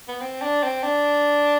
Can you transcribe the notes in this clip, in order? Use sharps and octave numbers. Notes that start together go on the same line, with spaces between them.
B3
C4
D4
C4
D4